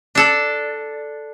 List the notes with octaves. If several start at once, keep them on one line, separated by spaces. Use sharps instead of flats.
D4 A4 D5